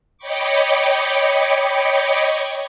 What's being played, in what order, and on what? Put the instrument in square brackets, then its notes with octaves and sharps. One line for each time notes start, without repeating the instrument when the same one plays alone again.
[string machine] C#5 D#5 G5 B5 C#6 D6